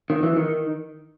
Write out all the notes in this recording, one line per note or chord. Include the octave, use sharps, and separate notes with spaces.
D#3
E3
D#3